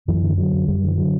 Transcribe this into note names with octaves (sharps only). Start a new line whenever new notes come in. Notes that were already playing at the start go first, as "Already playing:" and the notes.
F#2 E3
D3
D3 F#3
F#2
F#2 G3
D3 E3
D3 F#3